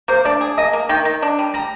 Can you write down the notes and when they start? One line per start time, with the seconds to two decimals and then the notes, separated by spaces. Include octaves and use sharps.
0.08 A#3 C5
0.25 D4 D5
0.41 G#4
0.58 A#3 D#5
0.73 A#3
0.89 D#3 G5
1.05 D#3
1.22 D4
1.39 G3
1.54 G3 A#5